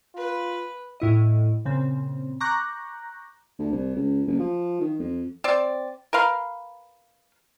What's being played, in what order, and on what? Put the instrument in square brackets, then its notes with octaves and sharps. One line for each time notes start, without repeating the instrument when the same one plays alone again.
[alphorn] F4 [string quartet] B4
[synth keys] A2 E4 D#5
A#2 C#3 C4
A#5 C#6 D6 F#6 G6 A#6
[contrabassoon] D2
C2
C#2
F#1
F3
D#3
F2
[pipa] C4 D5
A#4 B4 F5 C6